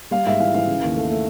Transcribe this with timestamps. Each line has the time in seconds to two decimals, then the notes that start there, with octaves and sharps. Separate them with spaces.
0.11 G3 F5
0.26 G#2 E5
0.40 E3 F5
0.54 E3 F5
0.67 C#3
0.82 D#2
0.97 A3
1.10 A3